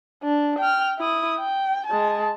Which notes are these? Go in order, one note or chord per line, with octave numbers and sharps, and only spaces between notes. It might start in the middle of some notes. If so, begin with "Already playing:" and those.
D4
G5 F6
E4 D#6
G5
G#3 A5